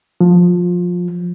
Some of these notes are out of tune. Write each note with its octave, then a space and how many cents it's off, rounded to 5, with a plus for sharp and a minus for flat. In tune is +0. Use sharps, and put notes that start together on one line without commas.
F3 +20